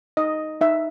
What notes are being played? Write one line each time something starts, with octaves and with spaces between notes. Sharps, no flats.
D#4 D#5
D#4 E5